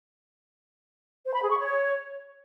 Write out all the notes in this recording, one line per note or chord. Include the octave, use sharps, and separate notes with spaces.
C5
B5
G#4
C#6
C#5